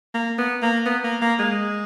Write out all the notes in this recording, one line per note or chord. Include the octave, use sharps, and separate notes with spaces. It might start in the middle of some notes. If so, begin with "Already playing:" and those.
A#3
B3
A#3
B3
A#3
A#3
G#3